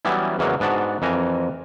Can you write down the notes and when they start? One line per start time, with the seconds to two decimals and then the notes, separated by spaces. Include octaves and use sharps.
0.05 E3 F#3 G3 B3 C#4 E4
0.39 E2 C#3 E3 F#3 G#3 A#3
0.60 G#2 B3 D4 F#4 A5
1.02 F2 E3 A#4 G#5 A#5